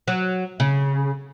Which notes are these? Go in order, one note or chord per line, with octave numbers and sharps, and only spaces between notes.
F#3
C#3